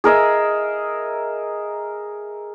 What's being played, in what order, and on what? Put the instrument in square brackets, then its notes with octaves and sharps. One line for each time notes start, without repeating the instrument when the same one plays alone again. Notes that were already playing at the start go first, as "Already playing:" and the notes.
[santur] G#4 A#4 D#5 E5